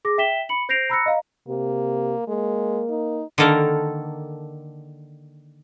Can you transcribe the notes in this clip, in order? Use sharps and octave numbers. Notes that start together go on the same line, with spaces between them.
G#4 D6 A#6
E5 G5 B6 E7 G7
B5 C#7 F#7
C5 G6 A#6 C7 D7 F7
A#5 B5 E6 F#6 A#6 C#7
D#5 F5 A#5
C3 A#3
G#3 A#3
D#4
D3 D#3 A#3 A4 A#4